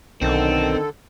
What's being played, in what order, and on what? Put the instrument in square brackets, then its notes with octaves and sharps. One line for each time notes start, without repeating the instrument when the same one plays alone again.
[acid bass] B1 [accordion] D3 A4 [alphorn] D#3 [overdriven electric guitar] C4